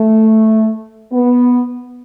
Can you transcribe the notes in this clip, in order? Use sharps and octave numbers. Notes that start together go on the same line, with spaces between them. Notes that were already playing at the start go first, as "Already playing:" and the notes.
Already playing: A3
B3